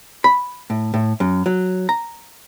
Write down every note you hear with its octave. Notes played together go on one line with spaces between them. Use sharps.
B5
A2
A2
F#2
F#3
A#5